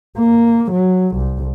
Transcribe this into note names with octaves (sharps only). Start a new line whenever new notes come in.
A#3
F#3
C2